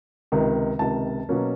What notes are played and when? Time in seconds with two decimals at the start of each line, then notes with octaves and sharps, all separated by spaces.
0.32 C#2 C3 D#3
0.79 C#2 C3 D#3 A5
1.29 B2 F#3 A#3 C#4